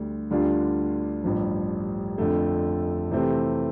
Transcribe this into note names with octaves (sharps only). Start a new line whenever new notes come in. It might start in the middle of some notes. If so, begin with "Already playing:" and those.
Already playing: D2 D3 G3
D2 D3 G3 D4 F4
A1 G2 F3
F2 D3 A3
C3 E3 A3 C4